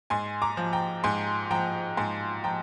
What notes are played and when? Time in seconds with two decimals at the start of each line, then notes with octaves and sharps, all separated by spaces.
0.10 G#2 G#5 C6
0.42 A#5 D6
0.57 F3
0.73 G5 A#5
1.04 G#2 G#5 C6
1.51 F3 G5 A#5
1.97 G#2 G#5 C6
2.44 F3 G5 A#5